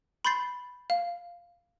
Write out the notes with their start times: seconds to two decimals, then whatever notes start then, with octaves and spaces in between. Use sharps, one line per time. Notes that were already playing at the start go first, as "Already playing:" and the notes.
0.25 B5 C6 G6 A6 C7
0.90 F5